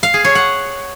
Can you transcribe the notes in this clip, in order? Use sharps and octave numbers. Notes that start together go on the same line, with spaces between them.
F5
G#4
C#5
F#5